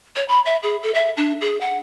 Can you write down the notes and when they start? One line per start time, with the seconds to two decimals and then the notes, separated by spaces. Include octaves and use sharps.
0.16 C#5
0.28 B5
0.46 E5
0.63 G#4
0.83 A4
0.94 E5
1.17 D4
1.41 G#4
1.61 F#5